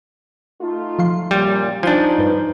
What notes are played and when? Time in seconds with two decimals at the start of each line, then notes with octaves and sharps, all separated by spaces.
0.61 A3 D#4 F4
0.99 F3 F5 C6
1.31 F#2 A#2 G3
1.83 F3 D4 D#4 G#5 G6
2.18 G2 B4